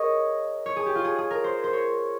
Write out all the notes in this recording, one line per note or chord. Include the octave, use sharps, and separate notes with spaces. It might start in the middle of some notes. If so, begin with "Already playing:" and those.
Already playing: G#4 A#4 C#5 D#5
C#5
G#4
G4
F4
G#4
G#4
A#4
C5
C5
C#5